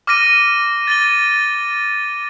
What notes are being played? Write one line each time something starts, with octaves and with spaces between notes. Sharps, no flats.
D6 F6 A#6 D#7
A6 D#7 G7